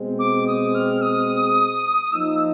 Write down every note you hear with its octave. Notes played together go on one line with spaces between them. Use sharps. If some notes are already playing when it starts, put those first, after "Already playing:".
Already playing: B2 G#3 C4
D6
D#6
F6
D#6
F3 A#3 D#4 E6